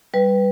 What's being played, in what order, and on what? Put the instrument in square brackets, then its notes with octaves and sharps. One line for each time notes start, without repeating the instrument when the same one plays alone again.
[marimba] G3 B4